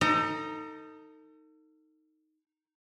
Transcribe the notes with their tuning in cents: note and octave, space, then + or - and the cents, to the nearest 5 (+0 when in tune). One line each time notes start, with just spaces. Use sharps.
D#4 +5 A4 +40 A#5 +0